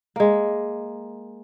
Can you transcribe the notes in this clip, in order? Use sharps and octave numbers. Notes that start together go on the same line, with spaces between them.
G#3 A#3